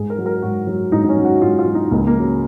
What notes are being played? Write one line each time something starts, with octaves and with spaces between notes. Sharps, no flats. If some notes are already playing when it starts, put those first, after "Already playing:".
Already playing: G#2 G#4
A#4
F#3
A#4
G#2 F#4
F#3
G#2 D#4
D#4
C#4
F#3
F#4
G#2 F4
F4
F#3
D#4
C#2 A#3
A#3
C#3 F#3